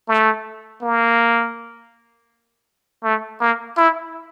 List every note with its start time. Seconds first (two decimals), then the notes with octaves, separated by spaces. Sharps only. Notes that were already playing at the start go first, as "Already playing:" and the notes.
0.08 A3
0.82 A#3
3.03 A3
3.40 A#3
3.77 E4